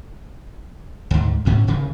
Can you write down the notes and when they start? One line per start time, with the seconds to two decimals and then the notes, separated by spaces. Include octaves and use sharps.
1.11 D2 G#2
1.45 D2 G#2 C#4
1.67 D#1 C#3